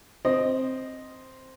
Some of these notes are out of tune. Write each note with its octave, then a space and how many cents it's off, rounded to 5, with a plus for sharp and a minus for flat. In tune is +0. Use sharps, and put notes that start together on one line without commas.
C4 +0 D#5 +0